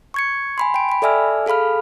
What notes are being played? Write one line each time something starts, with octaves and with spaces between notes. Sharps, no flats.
C#6 G#6 C#7
G#5 B5 C6
G5 D7
G5 B5
A4 D5 E5 G#5 E6 F6
G#4 A4 F5 B5 F6